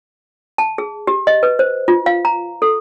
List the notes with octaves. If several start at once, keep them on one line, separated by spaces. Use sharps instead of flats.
A5
G#4
G4
D#5
B4
C5
F4
F5
A#5
A4